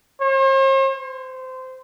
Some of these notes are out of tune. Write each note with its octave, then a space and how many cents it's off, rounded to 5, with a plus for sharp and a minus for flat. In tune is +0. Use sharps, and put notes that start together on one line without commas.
C5 +45
C5 -20